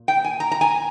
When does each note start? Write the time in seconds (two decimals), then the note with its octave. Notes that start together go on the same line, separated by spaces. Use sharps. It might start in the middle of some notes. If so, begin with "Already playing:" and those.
Already playing: A#2
0.08 G5
0.24 G#5
0.40 A#5
0.52 A#5
0.61 G#5